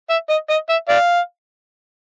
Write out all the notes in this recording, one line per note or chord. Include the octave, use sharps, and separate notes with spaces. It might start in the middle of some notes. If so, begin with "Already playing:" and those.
E5
D#5
D#5
E5
D5 F5